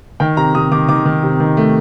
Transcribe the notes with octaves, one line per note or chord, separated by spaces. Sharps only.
D#3 G5
C3 A#5
C3 D#6
D#3 D6
D#3 D6
D#3
C3
D#3
A3